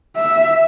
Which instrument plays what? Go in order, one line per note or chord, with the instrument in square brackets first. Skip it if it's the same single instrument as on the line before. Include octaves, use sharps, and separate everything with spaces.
[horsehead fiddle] E5